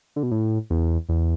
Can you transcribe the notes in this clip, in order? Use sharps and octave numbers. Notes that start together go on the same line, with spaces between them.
D3
B2
A2
E2
E2